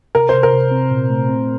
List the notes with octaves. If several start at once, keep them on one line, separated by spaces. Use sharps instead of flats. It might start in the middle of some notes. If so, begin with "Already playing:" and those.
C3 A#4
C3 C5
A#4
C3
C4
A#2
A3
C4